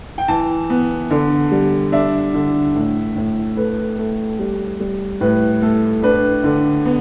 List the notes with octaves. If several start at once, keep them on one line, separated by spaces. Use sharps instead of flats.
G5
E3 A5
B3
D3
G3
D4 E5
D3
A2
A2
A3 B4
A3
G3
G3
A2 B4
A3 A4
D4 B4
D3
B3